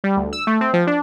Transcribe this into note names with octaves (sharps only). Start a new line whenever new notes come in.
G3
D2
E6
A3
C4
F3
D4